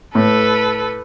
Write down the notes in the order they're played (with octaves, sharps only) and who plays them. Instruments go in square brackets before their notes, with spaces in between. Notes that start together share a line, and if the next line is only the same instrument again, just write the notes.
[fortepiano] A2 [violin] A4 B4